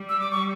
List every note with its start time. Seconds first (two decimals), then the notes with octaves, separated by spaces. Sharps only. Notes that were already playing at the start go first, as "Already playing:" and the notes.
Already playing: G3
0.09 E6
0.20 D6
0.32 C#6